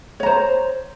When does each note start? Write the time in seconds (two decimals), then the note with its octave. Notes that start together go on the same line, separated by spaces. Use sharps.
0.20 C#5
0.23 A#5
0.26 C5